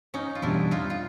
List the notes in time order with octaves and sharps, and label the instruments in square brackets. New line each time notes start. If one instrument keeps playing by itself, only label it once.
[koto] C#4 D#4
F4
[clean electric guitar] E2 B2 G3 [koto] D4 E4
[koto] D#4 F4
F4